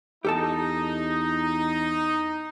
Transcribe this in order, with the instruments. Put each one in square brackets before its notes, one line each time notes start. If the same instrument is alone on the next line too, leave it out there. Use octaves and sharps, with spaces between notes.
[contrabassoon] E2 [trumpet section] D#4 [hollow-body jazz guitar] G4 A4 A5